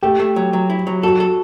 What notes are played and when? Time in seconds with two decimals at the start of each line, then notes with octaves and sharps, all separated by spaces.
0.03 A3 G4
0.20 A3
0.36 F#3
0.53 F#3
0.70 E4
0.87 F#3
1.03 F#4 A4
1.20 A4